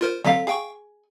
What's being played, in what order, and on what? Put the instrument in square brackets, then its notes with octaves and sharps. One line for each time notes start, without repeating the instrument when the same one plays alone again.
[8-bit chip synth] F4 A#4 C5
[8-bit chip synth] D3 F#3 B6 [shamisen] C4 A4 F5
[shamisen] G#4 [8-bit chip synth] F5 G5 C#6